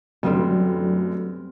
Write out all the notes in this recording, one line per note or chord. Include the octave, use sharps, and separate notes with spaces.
F#2 A2 D3 G3 B3 C4